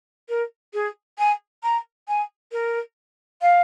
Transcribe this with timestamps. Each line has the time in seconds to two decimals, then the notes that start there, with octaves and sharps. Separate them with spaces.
0.28 A#4
0.73 G#4
1.18 G#5
1.63 A#5
2.07 G#5
2.51 A#4
3.41 F5